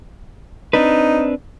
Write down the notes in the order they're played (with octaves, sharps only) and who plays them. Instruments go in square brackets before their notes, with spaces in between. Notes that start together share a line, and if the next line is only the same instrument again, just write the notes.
[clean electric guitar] C4 D4 B4 [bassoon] D#4